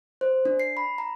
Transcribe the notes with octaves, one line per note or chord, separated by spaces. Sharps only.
C5
D4
C7
B5
A#5